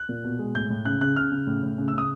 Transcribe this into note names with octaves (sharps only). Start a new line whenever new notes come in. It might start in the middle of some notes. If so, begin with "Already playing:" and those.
Already playing: F#6
A#2
B2
G#3
A2 G6
A2
C#3 F#6
C#3 F#6
C#3 F6
C#3
A2
A2
C#3
E6
C#3 D#6